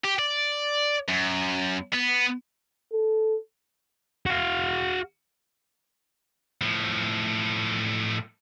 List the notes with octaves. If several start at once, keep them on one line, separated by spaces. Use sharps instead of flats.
G4
D5
F#2
B3
A4
F#4 F5
A2 F3